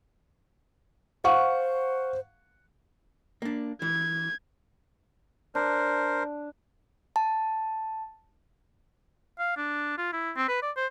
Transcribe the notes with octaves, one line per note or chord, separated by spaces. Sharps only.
C5 F5 F#5 C#6
A#3 D4
E3 G#6
D4 A#4 C5
A5
F5
D4
F4
E4
C4
B4
D5
C5